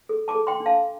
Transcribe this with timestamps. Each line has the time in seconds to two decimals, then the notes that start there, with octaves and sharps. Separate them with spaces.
0.09 A4
0.28 A5 D6
0.35 A4
0.47 G5 C6
0.60 D4
0.66 F5 A5